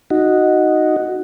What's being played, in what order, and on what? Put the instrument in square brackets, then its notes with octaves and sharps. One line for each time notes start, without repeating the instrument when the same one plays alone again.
[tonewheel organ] D#4 F#4